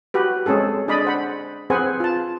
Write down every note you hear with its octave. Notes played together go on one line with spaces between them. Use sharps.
F#4 G4 B4
G#3 C4 C#4 G#4 A4
D4 G#4 D5 D#5 B5
C5 F#5 B5
C4 G#4 B4 C5 F#5 G#5
F4 A5